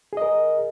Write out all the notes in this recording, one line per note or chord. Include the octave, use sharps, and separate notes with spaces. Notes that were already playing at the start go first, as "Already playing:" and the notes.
G#4 A#4 D#5